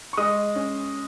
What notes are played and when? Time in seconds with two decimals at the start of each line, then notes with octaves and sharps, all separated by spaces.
0.13 C#6
0.17 G#3 D#5 D#6
0.55 C#4